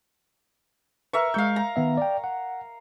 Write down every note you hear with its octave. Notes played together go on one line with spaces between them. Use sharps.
A#4 B4 E5 C#6
G#3 F5 C#6 G6
A#5
D#3 B3 E5
D5 G5
F#5